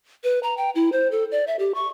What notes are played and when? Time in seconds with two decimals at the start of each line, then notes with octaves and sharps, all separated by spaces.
0.24 B4
0.43 A#5
0.57 G5
0.75 E4
0.92 C5
1.12 A4
1.32 D5
1.47 E5
1.59 G4
1.75 C#6